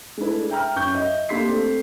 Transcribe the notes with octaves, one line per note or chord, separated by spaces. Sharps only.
G#3 A3 D4 E4 B4
E5 G5 A#5 F6
F#2 C#6 G6
D#5 E5
A#3 D4 G4 C6 B6 C7
A3 C4